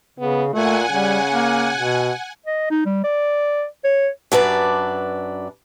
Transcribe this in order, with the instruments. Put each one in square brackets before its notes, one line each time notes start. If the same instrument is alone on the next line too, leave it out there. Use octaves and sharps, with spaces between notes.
[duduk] C#3 [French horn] B3
[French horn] A#2 [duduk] A3 [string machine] F#5 G#5
[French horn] C#3 [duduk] G3
[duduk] A#3
B2
[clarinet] D#5
D#4
G3
D5
C#5
[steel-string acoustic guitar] F#2 D4 B4 D5